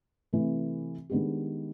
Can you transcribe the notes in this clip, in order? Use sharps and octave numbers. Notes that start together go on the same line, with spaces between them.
C3 E3 A3
D#3 G#3 B3 D4 G4